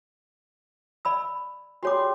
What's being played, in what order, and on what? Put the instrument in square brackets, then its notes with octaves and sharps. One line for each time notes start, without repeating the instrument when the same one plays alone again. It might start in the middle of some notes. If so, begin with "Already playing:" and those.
[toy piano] D5 B5 E6
[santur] G3 G#4 C6 [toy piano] F#4 C#5 D6